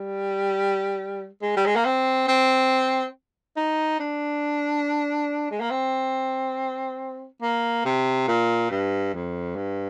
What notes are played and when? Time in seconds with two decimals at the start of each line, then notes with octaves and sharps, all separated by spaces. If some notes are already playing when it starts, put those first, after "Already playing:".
Already playing: G3
1.42 G#3
1.57 G3
1.66 G#3
1.76 A#3
1.85 C4
2.28 C4
3.57 D#4
4.00 D4
5.51 G#3
5.60 A#3
5.71 C4
7.42 A#3
7.85 C3
8.28 A#2
8.71 G2
9.14 F2
9.56 G2